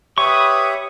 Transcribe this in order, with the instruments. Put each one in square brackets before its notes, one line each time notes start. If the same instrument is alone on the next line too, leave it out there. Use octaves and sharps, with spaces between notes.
[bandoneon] G4 C#5 E5 [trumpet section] B4 B5 D#6 [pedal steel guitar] C#6